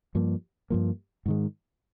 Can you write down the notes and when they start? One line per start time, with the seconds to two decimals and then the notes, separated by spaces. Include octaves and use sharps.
0.15 G2 F3 A#3
0.70 G2 F3 A#3
1.26 G#2 D#3 G#3